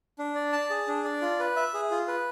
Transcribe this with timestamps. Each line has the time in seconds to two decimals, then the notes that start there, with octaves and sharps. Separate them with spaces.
0.19 D4
0.35 D5
0.53 A5
0.70 G#4
0.88 D4
1.04 D5
1.22 F4
1.40 B4
1.56 E5
1.74 G#4
1.91 F4
2.08 B4